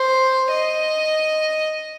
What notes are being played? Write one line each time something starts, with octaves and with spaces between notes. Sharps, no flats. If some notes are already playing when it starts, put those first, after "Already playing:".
Already playing: C5
D#5